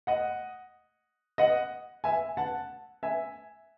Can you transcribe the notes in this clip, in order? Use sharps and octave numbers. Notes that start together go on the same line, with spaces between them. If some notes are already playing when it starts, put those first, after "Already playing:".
D#5 F#5
D#5 F#5
E5 G#5
F#5 A5
E5 G#5